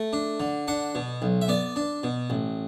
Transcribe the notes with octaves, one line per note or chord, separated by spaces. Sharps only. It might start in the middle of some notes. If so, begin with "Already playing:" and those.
Already playing: A3
D4
D3
D4 F#5
B2
B1
E5
B3 D5
D4
B2
A1